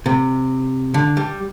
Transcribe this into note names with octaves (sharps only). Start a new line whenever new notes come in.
C3
D3
G3